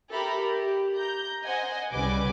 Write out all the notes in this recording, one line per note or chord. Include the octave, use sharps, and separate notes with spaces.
G4 A4 A#4 E5 A#5 B5
G4
A#5 G6
C5 D#5 F#5 G#5
C2 C#3 G3 B4 G#5 D6